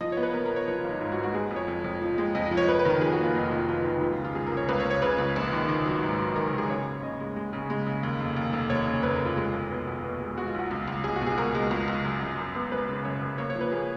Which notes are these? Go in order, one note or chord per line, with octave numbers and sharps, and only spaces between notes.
F3 D#5
C#5
B3
B4
B3 A#4
A#4
B3 C#5
F3 C#5
F4
G#1 D#4
G#2 F4
F#4
G#2
F#4
G#3 G#4
F2
C#5
F2
F2
F3
G#3
F2 D#5
D#5
F3
C#5
F2 B4
B4
D#3 A#4
F2 G#4
F#4
A#3 F4
F1 D#4
F4
F2
D#4
D#3 F4
D#3 D#4
C#2 F4
F4
C#3
F4
C#2 G#4
A#4
C#2
C#5
C#2 B4
C#5
C#2
C#5
C#3 B4
C#2
A#1
D#3
D#3
F#3
G#2
F#3
D#3 A#4
A#4
D#3
G#4
C#3 C#5
D#2
C#3 D#5
G#3
G#3
C#3
G#3
C#3
D#2
F1
D#2
F1
D#2 C#5
C#3
F1 B4
A#4
F1 F4
G#3
B1
B3
B2
B3
G#3
G#3 F#4
F4
B1 F#4
C#2
C#2
C#2 G#4
F#4
B2 G#4
C#2 A#4
G#3
C#2
C#2
F#2
F#2
F#2
B3
F#2 B4
C#3
F#2 C#5
F#2
A#3 C#5
C#5
F3
B4
A#3 G#4